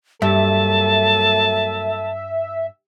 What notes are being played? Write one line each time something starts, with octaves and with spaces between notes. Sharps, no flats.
G2 F#3 A#3 A4 E5 A5